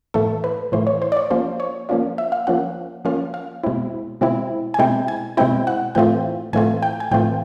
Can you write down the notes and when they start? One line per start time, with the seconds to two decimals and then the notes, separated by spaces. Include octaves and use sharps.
0.14 A2 E3 A3 A4
0.44 B4
0.72 A2 E3 A3 C5
0.87 C#5
1.02 C5
1.12 D5
1.17 C#5
1.31 F3 A#3 C#4 F4 C5
1.60 C#5
1.89 F3 A#3 C#4 F4 D5
2.18 E5
2.32 F5
2.47 F3 A#3 C#4 F4 F#5
3.05 F3 A#3 C#4 F4 F5
3.34 F5
3.64 B2 G#3 C4 E4
4.21 B2 G#3 C4 E4
4.74 G#5
4.79 B2 G#3 C4 E4 G5
5.08 G#5
5.37 B2 G#3 C4 E4 G5
5.67 F#5
5.95 A2 E3 A3 C4 F4 G5
6.53 A2 E3 A3 C4 F4 G#5
6.83 G5
7.00 G#5
7.11 A2 E3 A3 C4 F4 G5